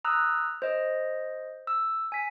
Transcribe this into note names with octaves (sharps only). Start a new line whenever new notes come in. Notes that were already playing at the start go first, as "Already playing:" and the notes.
A#5 D#6 E6 F#6
C5 D#5
E6
G#5 B6